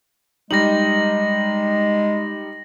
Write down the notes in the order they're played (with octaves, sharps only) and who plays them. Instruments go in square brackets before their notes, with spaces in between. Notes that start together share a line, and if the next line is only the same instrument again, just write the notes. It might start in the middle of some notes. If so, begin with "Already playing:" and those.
[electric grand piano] G3 D#4 [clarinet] G#3 [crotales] A#6 F#7